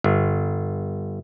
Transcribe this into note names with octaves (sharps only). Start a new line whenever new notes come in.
G1